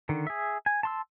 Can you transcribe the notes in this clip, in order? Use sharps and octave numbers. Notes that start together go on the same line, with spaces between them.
D3 D#3
G#4 E5
G#5
A5 C6 E6